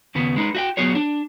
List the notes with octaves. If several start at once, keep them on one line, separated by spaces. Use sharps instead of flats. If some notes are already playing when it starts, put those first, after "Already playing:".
D#2 C#3 B3
G#3 D#4 B4
F#4 E5 G5
F#3 B3 F#4 G#4 C#5
D4